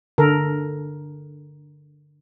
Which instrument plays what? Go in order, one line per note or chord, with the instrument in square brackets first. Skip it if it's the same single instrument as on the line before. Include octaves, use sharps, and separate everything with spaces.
[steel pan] D3 A4 A#4